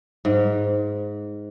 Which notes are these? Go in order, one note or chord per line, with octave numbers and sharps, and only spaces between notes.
G#2